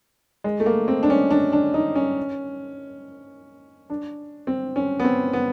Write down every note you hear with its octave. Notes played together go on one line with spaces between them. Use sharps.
G#3
A3
A#3
C4
D4
C#4
D4
D4
D#4
C#4
D4
C4
C#4
B3
C4
B3